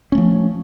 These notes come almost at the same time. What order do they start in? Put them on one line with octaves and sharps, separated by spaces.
C#4 A3 F3